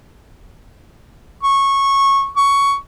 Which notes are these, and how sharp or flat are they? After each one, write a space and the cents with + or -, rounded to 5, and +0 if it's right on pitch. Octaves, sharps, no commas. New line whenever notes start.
C#6 -15
C#6 +10